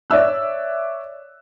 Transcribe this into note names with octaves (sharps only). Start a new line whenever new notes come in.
C#5 D5 E5 E6 F#6